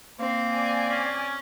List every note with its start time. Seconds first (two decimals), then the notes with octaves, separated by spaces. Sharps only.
0.19 A#3 C4
0.50 D5 G#5
0.88 C#4